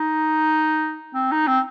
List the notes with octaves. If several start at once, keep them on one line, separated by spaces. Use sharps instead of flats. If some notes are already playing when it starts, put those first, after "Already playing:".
Already playing: D#4
C4
D#4
C4